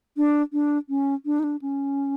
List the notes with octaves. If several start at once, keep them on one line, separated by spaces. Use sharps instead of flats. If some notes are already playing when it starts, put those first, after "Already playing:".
D4
D4
C#4
D4
D#4
D4
C#4